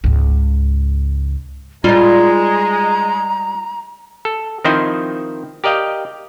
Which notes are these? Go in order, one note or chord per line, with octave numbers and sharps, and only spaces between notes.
C#2 G#2
G3 G#3 D#4 F4 A#5
A4
D#3 F3 C4 D#4 E4 C5
G4 A#4 D5 D#5 F5 G5